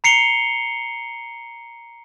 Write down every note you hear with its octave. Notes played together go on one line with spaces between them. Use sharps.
A#5 C7 C#7 F7 G7